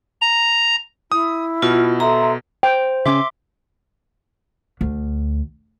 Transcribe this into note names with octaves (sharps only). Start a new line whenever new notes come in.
A#5
E4 D#6
B2 F4
A4 E5 A#5 C6
C5 G5
C#3 C#4 E5 C6 D6
D2